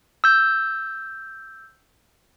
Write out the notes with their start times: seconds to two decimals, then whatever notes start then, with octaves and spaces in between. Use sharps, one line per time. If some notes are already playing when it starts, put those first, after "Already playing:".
0.24 E6 G6